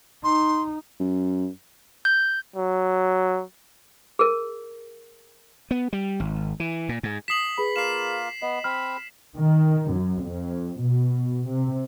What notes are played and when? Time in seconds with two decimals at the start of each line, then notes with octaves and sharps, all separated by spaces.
0.24 D#4 C6
1.00 F#2
2.05 G6
2.56 F#3
4.19 G#4 A#4
5.71 B3
5.93 G3
6.20 G#1
6.60 E3
6.89 A#2
7.03 G#2
7.28 D#6 B6 C7 E7 F#7
7.58 G#4 B4 B5
7.76 A#3 F4 C7 E7
8.42 B3 D#5
8.64 C4 B5 F6
9.38 D#3
9.92 F#2
10.24 F2
10.81 B2
11.49 C3